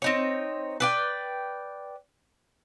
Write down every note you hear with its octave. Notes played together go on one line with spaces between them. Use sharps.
C4 D#4 C#5
B4 D5 G5